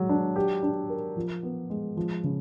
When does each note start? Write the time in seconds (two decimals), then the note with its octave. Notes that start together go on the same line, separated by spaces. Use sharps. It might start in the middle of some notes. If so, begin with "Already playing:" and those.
Already playing: F#3 G#3
0.09 D4
0.36 G4
0.63 D4
0.90 A#4
1.16 F3
1.43 B3
1.70 G#3
1.97 F3
2.24 C#3